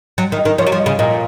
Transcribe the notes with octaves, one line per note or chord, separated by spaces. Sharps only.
F#3
D#3
D#5
D#3
F3 C#5
F#3
F3
D#5
C#3
A#2 D#5